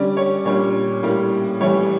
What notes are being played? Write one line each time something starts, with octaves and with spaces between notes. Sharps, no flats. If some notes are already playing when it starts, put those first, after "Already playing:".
Already playing: D3 G3 C#4 D5
C#5
A#2 G3 D4 C#5
A2 G3 A#3 C#4
A2 E3 G3 C#5